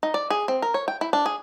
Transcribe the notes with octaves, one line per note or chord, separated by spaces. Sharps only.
D#4
D5
G#4
C4
A#4
C#5
G5
E4
D4
G#4